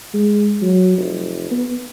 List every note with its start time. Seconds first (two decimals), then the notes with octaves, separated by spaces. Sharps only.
0.14 G#3
0.62 F#3
0.98 F1
1.51 B3